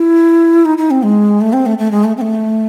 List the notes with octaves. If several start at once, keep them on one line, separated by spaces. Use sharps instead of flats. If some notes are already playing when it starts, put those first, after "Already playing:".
Already playing: E4
D#4
D#4
C4
G#3
A3
C4
A3
A3
G#3
A3
C4
A3